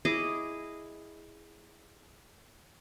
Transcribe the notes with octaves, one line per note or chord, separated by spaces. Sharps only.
E4 G#4 D#5 D6